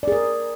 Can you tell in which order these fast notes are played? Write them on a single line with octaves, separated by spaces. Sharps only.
D5 G#4 A#4